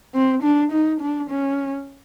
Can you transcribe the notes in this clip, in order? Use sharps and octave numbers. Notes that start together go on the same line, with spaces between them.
C4
D4
D#4
D4
C#4